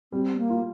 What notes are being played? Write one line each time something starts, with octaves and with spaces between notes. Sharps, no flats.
G3 C4
A#3
F4